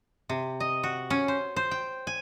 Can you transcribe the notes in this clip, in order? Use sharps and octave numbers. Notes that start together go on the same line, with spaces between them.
C3
D#5
F#4
C#4
C5
C5
G5
G#5